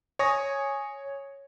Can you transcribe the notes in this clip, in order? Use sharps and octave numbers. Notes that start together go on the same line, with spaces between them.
C#5 G#5 C#6 D#6 A#6